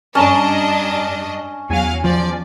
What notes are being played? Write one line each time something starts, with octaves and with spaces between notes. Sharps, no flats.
G2 C#4 D4 D#5 A5 A#5 E7
E2 F#3 F5 G#5
F3 D5